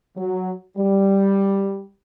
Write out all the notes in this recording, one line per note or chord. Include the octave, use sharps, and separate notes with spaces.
F#3
G3